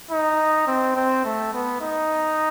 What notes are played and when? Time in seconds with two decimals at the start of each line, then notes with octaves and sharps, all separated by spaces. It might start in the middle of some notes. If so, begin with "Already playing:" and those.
0.11 D#4
0.67 C4
0.96 C4
1.25 A3
1.53 B3
1.81 D#4